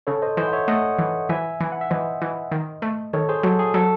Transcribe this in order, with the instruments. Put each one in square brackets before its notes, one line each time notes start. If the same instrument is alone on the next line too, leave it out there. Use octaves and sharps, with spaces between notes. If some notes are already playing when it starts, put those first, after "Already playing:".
[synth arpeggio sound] C#3 [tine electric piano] A4 C#5
[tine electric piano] C5 D#5
[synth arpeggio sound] E3 [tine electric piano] C5 D#5
[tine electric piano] F#5
C#5 E5
[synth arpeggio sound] A3 [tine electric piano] D#5 F#5
[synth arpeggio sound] E3
[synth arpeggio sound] E3 [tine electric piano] E5 G#5
[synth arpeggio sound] E3
[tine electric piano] F#5
E5
[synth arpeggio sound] E3 [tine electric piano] C5 D#5
[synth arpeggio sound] E3
D#3
A3
[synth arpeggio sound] D#3 [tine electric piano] A4 C#5
[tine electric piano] G#4 C5
[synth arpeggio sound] F#3 [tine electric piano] F#4 A4
[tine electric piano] G#4
[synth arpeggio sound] F#3 [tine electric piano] F#4 A4